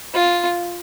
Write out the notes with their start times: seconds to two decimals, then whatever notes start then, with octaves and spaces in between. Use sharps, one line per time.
0.14 F4